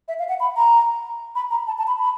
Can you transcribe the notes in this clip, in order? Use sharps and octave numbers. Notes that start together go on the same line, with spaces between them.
E5
F5
F#5
B5
A#5
B5
A#5
A5
A5
B5
B5